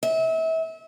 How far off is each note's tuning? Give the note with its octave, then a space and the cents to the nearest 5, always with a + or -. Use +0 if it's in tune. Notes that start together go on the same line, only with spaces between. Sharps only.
E5 -30